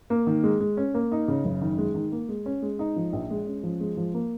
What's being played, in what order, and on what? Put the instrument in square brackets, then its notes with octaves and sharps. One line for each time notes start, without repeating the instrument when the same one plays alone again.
[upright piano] A#3
D#3
G#3
G#3
C#4
A#3
D#4
C#3
F#1
D#3
G#3
D#3
A#3
G#3
C#4
G#3
D#4
F3
A#1
G#3
C#4
F3
G#3
F3
A#3